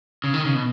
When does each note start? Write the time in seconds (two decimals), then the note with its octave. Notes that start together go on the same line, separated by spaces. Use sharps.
0.24 C#3
0.34 D#3
0.45 C#3
0.55 B2